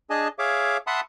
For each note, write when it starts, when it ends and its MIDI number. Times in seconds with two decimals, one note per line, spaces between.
0.10 0.28 62
0.10 0.28 68
0.10 0.28 75
0.10 0.28 80
0.10 0.28 81
0.39 0.78 68
0.39 0.78 73
0.39 0.78 76
0.39 0.78 77
0.39 0.78 86
0.87 1.01 76
0.87 1.01 78
0.87 1.01 81
0.87 1.01 83
0.87 1.01 84
0.87 1.01 87